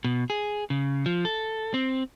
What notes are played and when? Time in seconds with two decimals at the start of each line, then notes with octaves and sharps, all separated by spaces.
0.04 B2
0.30 G#4
0.70 C#3
1.06 F3
1.25 A4
1.74 C4